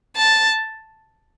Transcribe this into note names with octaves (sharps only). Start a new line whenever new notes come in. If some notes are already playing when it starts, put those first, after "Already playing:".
A5